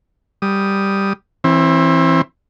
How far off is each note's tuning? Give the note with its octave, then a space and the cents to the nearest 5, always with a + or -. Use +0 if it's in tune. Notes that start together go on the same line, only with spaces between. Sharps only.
G3 +0 D#6 +0
E3 +5 C4 +30